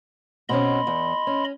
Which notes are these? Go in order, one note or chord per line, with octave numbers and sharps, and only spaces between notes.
B2 C4 C#4 D#5 B5 C6
E2
C#4